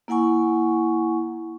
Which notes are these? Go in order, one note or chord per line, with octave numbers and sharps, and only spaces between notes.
A#3 E4 F#5 G#5 C#6